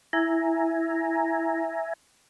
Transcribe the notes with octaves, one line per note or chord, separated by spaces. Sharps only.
E4 E5 G#5 A#5